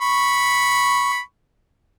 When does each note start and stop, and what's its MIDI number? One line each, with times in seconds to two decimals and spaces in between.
0.01 1.21 83
0.01 1.21 85